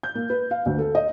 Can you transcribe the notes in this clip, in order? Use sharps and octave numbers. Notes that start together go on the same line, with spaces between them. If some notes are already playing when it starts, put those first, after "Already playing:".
G6
A#3
B4
F5
D2
A4
D#5